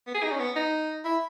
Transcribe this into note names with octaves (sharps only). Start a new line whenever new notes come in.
B3
G#4
D#4
C#4
B3
D#4
E4